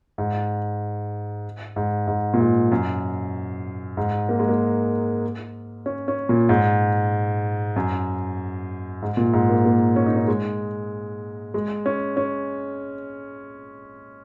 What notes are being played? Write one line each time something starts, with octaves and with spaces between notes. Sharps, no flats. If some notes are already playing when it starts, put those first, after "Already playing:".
G#2
G#2
G#2
A#2
G#2
F#2
G#2
A#3
G#3
A#3
C#4
C#4
A#2
G#2
F#2
G#2
A#2
G#2
A#3
A#3
C#4
D#4
C#4
G#3
G#3
C#4
C#4